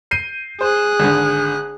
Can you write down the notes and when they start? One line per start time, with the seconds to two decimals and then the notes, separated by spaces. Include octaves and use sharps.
0.11 G6 C7 D#7
0.61 G#4 C5 F#6
1.00 G#1 D3